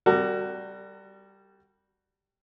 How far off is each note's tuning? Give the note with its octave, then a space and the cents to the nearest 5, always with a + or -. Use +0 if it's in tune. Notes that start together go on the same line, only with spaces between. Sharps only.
G3 +0 F#4 +10 A#4 -45